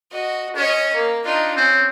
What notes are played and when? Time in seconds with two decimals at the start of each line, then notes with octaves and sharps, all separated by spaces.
0.12 F#4 D#5
0.56 C#4 C#5 D#5
0.94 A#3
1.25 D4 D#4 F4
1.56 C4 C#4